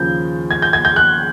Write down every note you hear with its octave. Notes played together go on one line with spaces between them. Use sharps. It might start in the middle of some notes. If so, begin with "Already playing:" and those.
Already playing: D#2 C#3 F3 G6
G#6
G6
G#6
G6
F#6